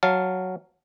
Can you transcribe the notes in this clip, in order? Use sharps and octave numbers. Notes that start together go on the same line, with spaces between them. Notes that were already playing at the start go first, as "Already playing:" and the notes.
F#3 F5 A5